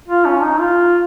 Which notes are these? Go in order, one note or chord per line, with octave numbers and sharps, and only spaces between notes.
F4
C#4
D#4
F4